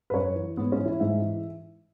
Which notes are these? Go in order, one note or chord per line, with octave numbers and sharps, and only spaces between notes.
B4
F#2 C#5
E3
G#2 B3
C#4
E3
E4
G#2 E5
E3